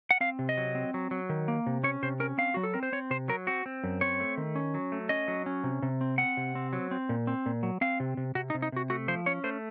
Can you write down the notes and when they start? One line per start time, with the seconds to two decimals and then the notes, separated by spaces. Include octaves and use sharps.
0.11 F#5
0.21 C4 F5
0.39 C3
0.49 D#5
0.57 F#3
0.75 C4
0.94 F#3
1.11 F#3
1.29 D#3
1.48 A#3
1.66 C3
1.84 C#4 C#5
2.03 C3 C5
2.20 C#4 A#4
2.38 C4 F5
2.54 F#3 F#4
2.63 A4
2.74 C4 A#4
2.83 C5
2.92 C4 C#5
3.11 C3 C5
3.28 F#3 A#4
3.47 C4 F#4
3.66 C4
3.84 F#2
4.01 C4 C#5
4.20 A3
4.37 D#3
4.55 C#4
4.74 F#3
4.92 A3
5.09 C#4 D#5
5.28 F#3
5.46 C#4
5.64 C3
5.83 C3
6.01 C4
6.18 C4 F#5
6.37 C3
6.55 C4
6.73 F#3
6.91 C4
7.09 A#2
7.27 C4
7.46 A#2
7.63 F#3
7.81 C4 F5
8.00 C3
8.17 C3
8.35 C3 F#4
8.50 D#4
8.54 C3
8.62 D#4
8.72 C3 F#4
8.90 A3 F#4
9.08 F3 C5
9.26 C#4 C#5
9.44 A3 C5